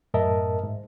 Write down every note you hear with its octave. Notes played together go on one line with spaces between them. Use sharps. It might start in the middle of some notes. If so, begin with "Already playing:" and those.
F#2 A2 A#4 D#5 E5 A5
G#2